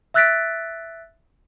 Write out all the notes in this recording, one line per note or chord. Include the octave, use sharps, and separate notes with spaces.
E5 E6 F#6 A6 B6 D7